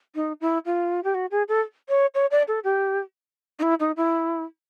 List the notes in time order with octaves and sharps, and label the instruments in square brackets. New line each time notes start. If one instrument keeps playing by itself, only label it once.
[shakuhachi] D#4
E4
F4
G4
F#4
G#4
A4
C#5
C#5
D5
A4
G4
D#4
E4
D#4
E4